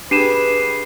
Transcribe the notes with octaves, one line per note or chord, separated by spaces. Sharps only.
D4 G4 G#4 B4 C7 D#7 E7